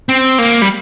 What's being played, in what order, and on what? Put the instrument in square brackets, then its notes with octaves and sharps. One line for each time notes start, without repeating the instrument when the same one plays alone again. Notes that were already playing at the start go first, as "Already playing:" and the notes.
[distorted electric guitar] C4
A#3
G3